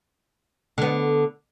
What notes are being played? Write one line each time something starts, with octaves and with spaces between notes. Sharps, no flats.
D3 B3